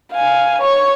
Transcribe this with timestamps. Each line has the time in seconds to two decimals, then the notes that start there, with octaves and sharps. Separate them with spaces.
0.13 F5 G#5
0.61 C#5 C#6